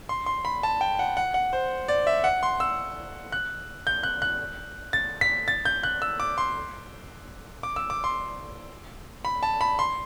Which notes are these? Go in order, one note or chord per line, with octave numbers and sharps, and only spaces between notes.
C6
C6
B5
A5
G5
F#5
F#5
F#5
C5
D5
E5
F#5
C6
E6
F#6
G6
F#6
F#6
A6
B6
A6
G6
F#6
E6
D6
C6
D6
E6
D6
C6
B5
A5
B5
C6